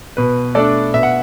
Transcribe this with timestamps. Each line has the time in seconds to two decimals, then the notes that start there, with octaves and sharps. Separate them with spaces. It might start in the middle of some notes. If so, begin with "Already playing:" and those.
0.17 B2 B4
0.55 A3 D4 A4 D5
0.94 B2 E5
1.03 F#5